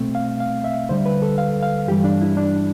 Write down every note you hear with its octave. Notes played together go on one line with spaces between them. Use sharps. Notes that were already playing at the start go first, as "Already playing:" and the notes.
Already playing: C2 B2 A3 C4
F5
F5
E5
D2 D3 G3 C5
B4
A4
F5
F5
G2 E3 G3 G4
D4
E4
D4